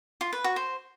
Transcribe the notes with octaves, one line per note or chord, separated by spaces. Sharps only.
F4
B4
F#4
C5